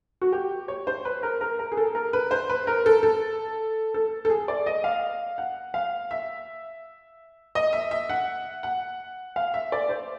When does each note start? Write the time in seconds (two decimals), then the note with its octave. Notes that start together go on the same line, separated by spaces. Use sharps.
0.21 F#4
0.32 G4
0.68 C#5
0.87 C5
1.05 B4
1.23 A#4
1.41 A#4
1.59 A#4
1.72 G#4
1.77 A4
1.95 A#4
2.13 B4
2.31 C5
2.50 B4
2.67 A#4
2.86 A4
3.03 A4
3.94 A4
4.25 A4
4.30 G#4
4.48 D5
4.66 D#5
4.84 F5
5.38 F#5
5.74 F5
6.11 E5
7.55 D#5
7.73 E5
7.91 E5
8.09 F#5
8.63 F#5
9.36 F5
9.54 E5
9.72 D5
9.89 C5